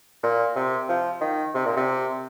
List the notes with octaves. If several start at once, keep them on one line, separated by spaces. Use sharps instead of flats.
A#2
C3
F3
D#3
C3
A#2
C3